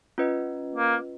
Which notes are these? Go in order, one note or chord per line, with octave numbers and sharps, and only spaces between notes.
C#4 F4 B4 D#5
A#3